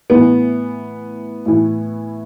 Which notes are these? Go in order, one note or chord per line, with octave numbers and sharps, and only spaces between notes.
A2 E3 B3
A2 E3